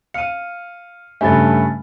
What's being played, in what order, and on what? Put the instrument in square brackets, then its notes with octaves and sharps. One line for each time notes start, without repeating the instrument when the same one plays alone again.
[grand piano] F5 F6 [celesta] C#7 D#7
[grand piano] G2 C#3 A3 [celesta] G#5 B5 A6